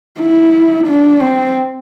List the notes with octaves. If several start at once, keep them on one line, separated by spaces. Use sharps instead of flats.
E4
D4
C4